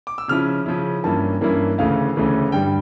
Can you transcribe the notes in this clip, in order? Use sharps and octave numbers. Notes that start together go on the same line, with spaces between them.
D6
E6
C#3 F3 C#4 E4 F6
C#3 F3 C#4 E4
G2 E3 A#3 C#4 E4 A5
G2 E3 A#3 C#4 E4
D2 C#3 E3 A3 C#4 F5
D2 C#3 E3 A3 C#4
G2 D3 G3 G5